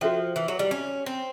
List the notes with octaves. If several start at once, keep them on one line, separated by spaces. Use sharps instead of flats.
F3 F#4 A4 C5 E5 G5
E3
F#3
G3
C#4
C4